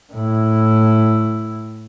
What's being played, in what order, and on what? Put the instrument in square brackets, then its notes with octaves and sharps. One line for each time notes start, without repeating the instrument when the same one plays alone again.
[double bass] A2 E4